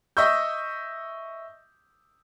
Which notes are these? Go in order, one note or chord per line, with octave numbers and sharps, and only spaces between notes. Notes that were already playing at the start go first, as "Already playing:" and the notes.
D#5 E5 C#6 E6 G6